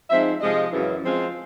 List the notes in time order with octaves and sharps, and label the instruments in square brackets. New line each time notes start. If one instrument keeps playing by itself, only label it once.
[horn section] F3 G#3 C4 D#4 E5
C3 F3 G#3 D#5
F#2 C#3 E3
F3 G#3 C4 F4